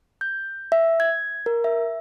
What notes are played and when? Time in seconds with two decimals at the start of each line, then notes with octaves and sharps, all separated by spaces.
0.21 G6
0.72 E5
1.00 G#6
1.46 A#4
1.64 E5